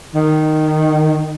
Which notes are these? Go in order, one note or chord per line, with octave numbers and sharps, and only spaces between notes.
D#3